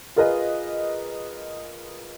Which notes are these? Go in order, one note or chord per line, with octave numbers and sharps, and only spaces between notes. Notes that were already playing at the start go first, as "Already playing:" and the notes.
F4 G#4 A#4 B4 D#5